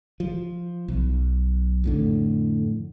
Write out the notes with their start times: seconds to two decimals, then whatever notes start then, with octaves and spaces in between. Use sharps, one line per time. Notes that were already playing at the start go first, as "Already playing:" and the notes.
0.20 F3
0.88 B1
1.84 F2 A2 D3